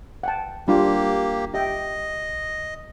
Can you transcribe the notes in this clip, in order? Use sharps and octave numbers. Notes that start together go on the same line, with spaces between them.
F#5 G5 A5
G3 A#3 D4 F4 G4
G4 D#5 E5 G5